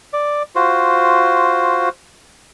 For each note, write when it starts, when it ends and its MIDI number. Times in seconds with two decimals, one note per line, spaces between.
0.13 0.43 74
0.55 1.89 65
0.55 1.89 66
0.55 1.89 72